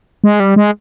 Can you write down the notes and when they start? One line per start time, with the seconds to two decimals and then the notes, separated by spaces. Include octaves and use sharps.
0.24 G#3
0.40 G3
0.56 G#3